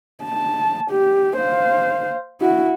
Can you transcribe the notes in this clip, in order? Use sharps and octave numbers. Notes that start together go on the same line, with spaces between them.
A5
G4
C5 F5
E4 F#4